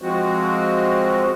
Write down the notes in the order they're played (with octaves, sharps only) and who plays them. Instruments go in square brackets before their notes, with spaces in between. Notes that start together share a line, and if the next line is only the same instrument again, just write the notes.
[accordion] F3 G#3 C4 F#4